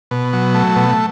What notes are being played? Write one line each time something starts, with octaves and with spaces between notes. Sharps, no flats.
B2
F#3
A3
B2